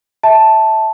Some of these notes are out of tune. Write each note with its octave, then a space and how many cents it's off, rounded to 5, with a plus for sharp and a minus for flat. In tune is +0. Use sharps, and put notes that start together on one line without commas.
E5 -20 A5 +0